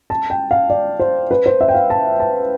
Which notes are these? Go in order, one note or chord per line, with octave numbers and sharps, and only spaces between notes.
A5
G5
F5
D5
C5
B4
C5
E5
G5
F5
A5
A5